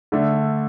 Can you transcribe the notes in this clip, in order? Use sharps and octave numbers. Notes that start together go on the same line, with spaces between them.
D3 A3 D4